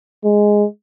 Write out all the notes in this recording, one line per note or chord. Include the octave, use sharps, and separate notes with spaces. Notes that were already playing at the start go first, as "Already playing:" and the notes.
G#3